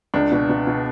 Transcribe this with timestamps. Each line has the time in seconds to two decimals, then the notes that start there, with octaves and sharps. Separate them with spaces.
0.14 C#2 D4
0.32 B2
0.49 B2
0.67 B2